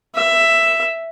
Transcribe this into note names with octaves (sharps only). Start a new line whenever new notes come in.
E5